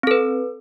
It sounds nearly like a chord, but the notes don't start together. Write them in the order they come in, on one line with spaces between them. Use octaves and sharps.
C4 A4 B4